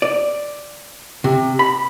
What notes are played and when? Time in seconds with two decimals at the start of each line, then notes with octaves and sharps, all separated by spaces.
0.02 D5
1.24 C3
1.59 B5